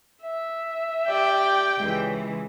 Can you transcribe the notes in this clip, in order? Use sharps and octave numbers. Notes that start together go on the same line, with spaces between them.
E5
G4 D5 G5
C#2 E3